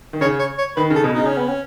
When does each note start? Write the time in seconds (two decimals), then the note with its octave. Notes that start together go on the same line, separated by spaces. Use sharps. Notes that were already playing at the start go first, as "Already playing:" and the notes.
0.13 D#3
0.21 C#3 C#5
0.40 C#5
0.58 C#5
0.76 D#3 B4
0.90 C#3
0.96 A4
1.04 B2
1.14 C#3 D#4
1.26 C#4
1.37 B3
1.49 C#4